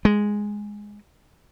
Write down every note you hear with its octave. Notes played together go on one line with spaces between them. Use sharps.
G#3